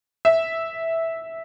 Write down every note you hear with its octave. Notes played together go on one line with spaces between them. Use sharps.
E5